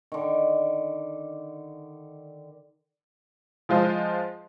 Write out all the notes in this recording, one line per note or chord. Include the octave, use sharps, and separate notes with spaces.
D3 D#3
F3 G#3 F4 C5 D#5